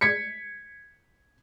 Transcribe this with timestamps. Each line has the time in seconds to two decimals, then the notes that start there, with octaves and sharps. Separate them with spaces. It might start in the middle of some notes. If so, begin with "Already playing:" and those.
0.01 G#6 B6 C#7